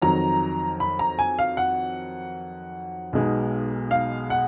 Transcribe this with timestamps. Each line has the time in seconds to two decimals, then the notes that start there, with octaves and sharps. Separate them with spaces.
0.02 F2 D#3 F#3 A#5
0.80 B5
0.99 A#5
1.19 G#5
1.39 F5
1.57 F#5
3.13 B1 B2 G#3 D#4
3.91 F5
4.30 F#5